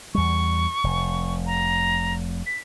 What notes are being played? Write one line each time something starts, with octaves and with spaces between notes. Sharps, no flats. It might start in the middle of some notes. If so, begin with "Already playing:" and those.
E2 G3 C#6
F1
A#5
B6